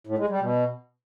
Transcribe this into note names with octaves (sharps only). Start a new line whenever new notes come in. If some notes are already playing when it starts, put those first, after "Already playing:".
A2
G#3
G3
B2